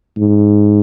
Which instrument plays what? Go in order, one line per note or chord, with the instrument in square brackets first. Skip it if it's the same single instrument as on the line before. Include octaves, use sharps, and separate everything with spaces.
[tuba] G#2